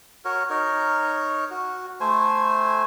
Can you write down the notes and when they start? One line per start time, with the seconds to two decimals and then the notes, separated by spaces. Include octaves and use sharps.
0.25 F#4 A#4 C#5
0.50 D#4 A#4 C#5
1.50 F#4
2.00 A3 C5 G#5